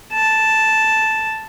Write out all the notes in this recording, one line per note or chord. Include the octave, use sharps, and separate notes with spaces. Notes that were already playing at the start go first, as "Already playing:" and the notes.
A5